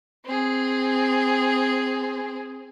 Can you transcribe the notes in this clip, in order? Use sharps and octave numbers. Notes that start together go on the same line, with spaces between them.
C4 G#4